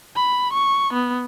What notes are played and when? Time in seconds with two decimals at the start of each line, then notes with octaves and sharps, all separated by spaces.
0.16 B5
0.54 C#6
0.94 B3